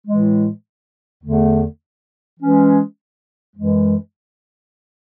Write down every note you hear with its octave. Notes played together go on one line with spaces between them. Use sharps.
A2 E3 G#3
E2 D3 A3
E3 G#3 C#4
F#2 E3 G#3